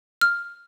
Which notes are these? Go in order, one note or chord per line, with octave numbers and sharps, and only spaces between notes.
F6